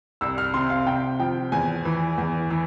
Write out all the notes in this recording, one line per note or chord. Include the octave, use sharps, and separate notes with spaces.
C2 E6
F6
C3 C6
F5
C3 G5
F3 G5
E2 G#5
E3
E2
E3